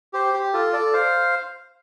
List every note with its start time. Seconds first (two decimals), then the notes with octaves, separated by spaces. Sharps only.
0.13 G4 C5
0.34 G4
0.53 F4 A4
0.73 A4 D5
0.93 C5 F5